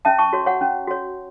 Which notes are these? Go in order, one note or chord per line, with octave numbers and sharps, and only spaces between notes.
C#4 E5 A5
A5 C#6
F#4 C#5
C#5 F#5
C#4
F#4 C#5